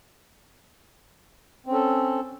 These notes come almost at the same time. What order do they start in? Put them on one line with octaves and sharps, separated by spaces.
C4 C#4 A4